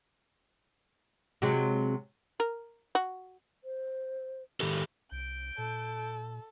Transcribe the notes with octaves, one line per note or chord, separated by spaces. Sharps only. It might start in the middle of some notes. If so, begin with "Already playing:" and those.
C3 F#3 G#3
A#4
F#4
C5
D#3 G4 A4
C2 G6 D7
A#2 A4